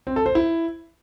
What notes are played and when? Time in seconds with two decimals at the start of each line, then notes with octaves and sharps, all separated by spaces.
0.07 C4
0.16 A4
0.26 C5
0.35 E4